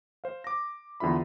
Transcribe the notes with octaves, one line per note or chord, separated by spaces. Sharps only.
C5 F5
D6 A#6
E2 D3 F4 E5 B5